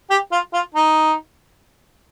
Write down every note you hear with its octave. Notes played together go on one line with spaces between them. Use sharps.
G4
F4
F4
D#4